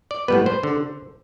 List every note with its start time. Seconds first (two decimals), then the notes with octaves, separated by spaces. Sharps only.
0.11 D5
0.28 A2 G3 B3 B4
0.46 C5
0.63 D3